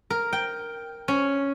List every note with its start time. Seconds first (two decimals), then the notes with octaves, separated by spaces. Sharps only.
0.10 A#4
0.33 G5
1.08 C#4